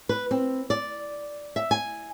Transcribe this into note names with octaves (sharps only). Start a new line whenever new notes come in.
B4
C4
D5
E5
G#5